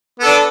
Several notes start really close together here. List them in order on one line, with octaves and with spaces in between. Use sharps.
B3 A4 D4